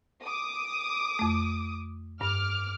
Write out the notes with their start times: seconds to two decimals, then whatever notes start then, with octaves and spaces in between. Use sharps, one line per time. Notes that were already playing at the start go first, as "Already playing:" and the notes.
0.22 D6 D#6
1.19 F2 A3
2.21 G2 D6 F6